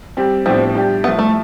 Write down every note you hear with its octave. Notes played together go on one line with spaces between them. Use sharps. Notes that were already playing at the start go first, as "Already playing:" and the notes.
G3 C4 G4
A2 F3 B3 C4 D4 G4
G3 D4 G4
F3 A3 B3 E4
A3